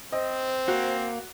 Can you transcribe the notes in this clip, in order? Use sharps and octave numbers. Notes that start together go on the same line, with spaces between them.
C4 C5 D#5
A#3 F#4